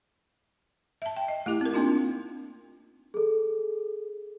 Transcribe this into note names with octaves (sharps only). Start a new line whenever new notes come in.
E5 A5
G5
D#5
A3 E4 G4 D6
C4 A#4
A#3 C4 D4 D#4 F4
G#4 A4